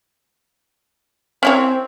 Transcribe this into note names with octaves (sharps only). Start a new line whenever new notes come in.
C4 C#4 E4 C#5